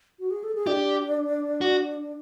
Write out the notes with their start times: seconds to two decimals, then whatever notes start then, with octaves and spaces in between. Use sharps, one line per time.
0.19 F#4
0.31 G#4
0.43 A4
0.55 G#4
0.67 D4 G4
1.61 F#4